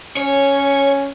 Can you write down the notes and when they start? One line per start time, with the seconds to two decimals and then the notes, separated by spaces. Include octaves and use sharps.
0.17 C#4 C#5